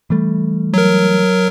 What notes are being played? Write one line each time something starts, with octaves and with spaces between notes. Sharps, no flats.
E3 G3 A3
F#3 A#4